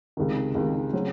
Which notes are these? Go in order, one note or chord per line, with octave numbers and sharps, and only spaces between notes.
C#2 C3 D#3
C#2 C3 D#3
C#3 F#3 C4